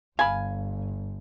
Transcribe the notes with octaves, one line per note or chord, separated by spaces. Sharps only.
G1 F5 G#5 B5